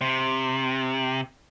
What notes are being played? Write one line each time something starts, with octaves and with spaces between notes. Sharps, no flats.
C3